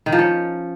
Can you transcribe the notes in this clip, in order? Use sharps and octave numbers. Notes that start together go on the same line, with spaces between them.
D#3
F3
C#4